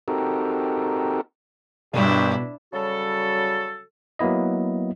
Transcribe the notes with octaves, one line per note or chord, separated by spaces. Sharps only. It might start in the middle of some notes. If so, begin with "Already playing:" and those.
C4 D#4 F#4 G4 A4 A#4
B1 G2 B2 D4 E4 G4 A#4 D5
C#3 F#3 G3 F#4 A4
F#3 A#3 B3 E4 D#5